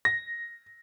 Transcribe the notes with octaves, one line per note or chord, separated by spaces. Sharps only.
A#6